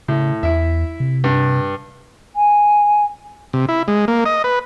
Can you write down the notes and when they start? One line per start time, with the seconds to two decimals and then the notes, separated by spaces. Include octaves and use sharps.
0.08 A2 C#3
0.43 E2 E4 E5
1.00 C3
1.24 G2
2.36 G#5
3.53 C3
3.69 E4
3.88 G#3
4.08 A#3
4.26 D#5
4.44 B4